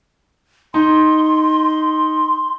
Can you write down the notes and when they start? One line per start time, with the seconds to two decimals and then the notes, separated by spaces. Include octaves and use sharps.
0.74 D#4 C6